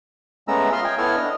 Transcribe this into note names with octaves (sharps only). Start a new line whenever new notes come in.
G#3 A3 B3 C#4 A#5 E6
F4 D#5 E5 C6 F6
G5 G#5
B3 E4 A4 C#5 E6 F6
D4 D#5